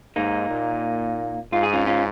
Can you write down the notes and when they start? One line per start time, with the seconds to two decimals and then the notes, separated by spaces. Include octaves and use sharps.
0.16 G#2 A#3 D#4
0.50 A#2
1.52 G#2 F4
1.63 G#4
1.73 C#4 F4
1.86 C#4 F4